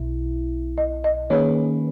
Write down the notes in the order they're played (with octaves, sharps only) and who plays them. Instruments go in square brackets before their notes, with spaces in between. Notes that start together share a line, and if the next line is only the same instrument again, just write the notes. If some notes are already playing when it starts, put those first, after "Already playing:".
Already playing: [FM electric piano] B1 B2 E4
[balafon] D#5
D#5
[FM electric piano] D#3 A#3 C#4 G#4 B4 [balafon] C#5